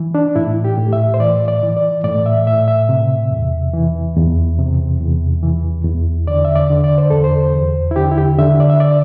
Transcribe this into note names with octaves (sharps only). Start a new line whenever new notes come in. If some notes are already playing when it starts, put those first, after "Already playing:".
Already playing: E3
D4
A2 E4
G4
A2
E5
C5
E3 D5
D5
E3
D5
A2 D5
E5
A2 E5
E5
C3
E2
E3
E2
C3
E2
E3
E2
D3 D5
E5
D5
D3
D5
C5
E2 A4
C5
E2
E4
D3 G4
E4
G4
D3 E5
D5
E5
D5